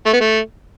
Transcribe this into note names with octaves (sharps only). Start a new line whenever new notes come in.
A3
B3
A3